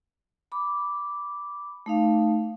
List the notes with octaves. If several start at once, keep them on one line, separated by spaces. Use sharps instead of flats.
B5 D6
A3 D#4 F5